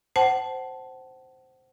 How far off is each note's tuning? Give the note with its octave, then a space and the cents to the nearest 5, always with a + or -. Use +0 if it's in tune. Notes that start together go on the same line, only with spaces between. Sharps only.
C5 +0 F#5 +30 A5 -10